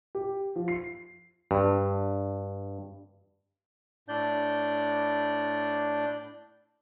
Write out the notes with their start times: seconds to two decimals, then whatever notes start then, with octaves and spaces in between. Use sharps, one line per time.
0.15 G4
0.56 F3
0.68 C7
1.51 G2
4.08 A2 D4 D5 G6